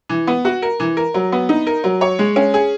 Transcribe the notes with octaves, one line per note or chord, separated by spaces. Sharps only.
E3
B3
F#4
A#4
E3
A#4
F#3
B3
D#4
A#4
F#3
C#5
G#3
C#4
G#4